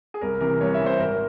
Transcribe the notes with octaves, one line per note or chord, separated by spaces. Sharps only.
G#4
C2 A#4
C3 E3 A#4
C2 C#5
E5
C3 E3
C5
G#1 A#4